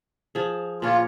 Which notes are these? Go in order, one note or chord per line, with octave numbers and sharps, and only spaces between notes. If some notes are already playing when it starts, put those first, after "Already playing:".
F3 G#4
A#2 C#4 F4 C#5